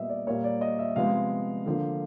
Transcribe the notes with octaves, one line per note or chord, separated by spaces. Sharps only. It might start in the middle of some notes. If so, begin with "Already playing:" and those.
Already playing: A#2 G3 B3 D#5 E5
D5
A#2 G3 A#3 C#5
D5
D#5
E5
C3 F3 G#3 B3 F5
D3 F3 A#3